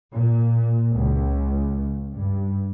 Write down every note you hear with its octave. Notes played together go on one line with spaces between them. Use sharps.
A#2
C#2
G2